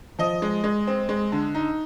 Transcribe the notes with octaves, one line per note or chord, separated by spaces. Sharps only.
F3 D#5
G#3
G#3
C4
G#3
D3
D#4